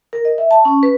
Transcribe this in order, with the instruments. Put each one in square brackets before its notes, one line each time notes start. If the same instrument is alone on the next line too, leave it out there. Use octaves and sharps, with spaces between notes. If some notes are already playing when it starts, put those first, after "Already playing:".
[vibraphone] A#4
D#5
E5
A5
C#4
B4